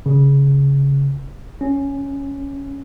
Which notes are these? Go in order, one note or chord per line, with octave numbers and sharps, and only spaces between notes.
C#3
C#4